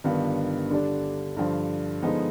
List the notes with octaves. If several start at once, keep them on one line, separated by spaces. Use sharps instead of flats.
G1 G2 D#3 B3 F4
D3 G3 D4
G2 D3 F3
D3 F3 G#3 B3 D#4